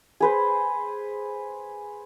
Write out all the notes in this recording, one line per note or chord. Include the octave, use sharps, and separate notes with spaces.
G#4 B4 C5